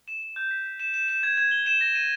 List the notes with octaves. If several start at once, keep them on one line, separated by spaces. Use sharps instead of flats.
E7
E7
G6
B6
B6
E7
E7
E7
G#6
G#6
G7
E7
A#6
D#7